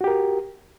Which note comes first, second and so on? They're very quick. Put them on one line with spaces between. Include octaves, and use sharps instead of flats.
F#4 G4 A#4